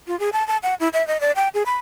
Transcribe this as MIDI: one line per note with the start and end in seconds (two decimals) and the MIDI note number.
0.07 0.18 65
0.20 0.30 68
0.33 0.46 81
0.48 0.57 81
0.63 0.74 78
0.80 0.89 64
0.93 1.06 76
1.08 1.20 75
1.21 1.32 74
1.36 1.48 79
1.54 1.63 68
1.66 1.77 83